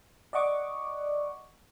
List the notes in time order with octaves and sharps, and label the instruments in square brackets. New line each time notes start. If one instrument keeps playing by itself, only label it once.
[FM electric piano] D5 D#5 F#5 C#6 D6